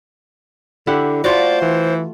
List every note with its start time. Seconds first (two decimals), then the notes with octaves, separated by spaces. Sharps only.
0.87 D3 E4 G4 F#5
1.24 A3 F4 F#4 C5 D5
1.62 E3